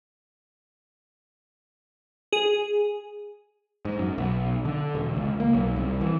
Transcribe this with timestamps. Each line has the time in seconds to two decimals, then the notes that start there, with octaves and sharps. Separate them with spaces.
2.33 G#4
3.85 G#2
3.99 F#2
4.18 B1
4.65 D3
4.95 E1
5.16 C#2
5.40 A#3
5.54 B1
5.76 C2
6.01 E3